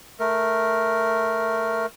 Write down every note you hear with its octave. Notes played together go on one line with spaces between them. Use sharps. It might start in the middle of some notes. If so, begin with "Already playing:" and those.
A3 A#4